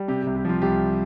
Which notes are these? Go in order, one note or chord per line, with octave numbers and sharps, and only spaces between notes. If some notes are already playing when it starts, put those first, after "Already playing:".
Already playing: G3
C3 G4
C2 G4
G4
F3 F4
C2 G4